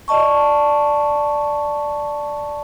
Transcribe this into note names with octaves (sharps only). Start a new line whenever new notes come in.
D5 D#5 A5 C#6